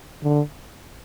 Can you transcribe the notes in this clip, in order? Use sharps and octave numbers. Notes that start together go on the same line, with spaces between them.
D3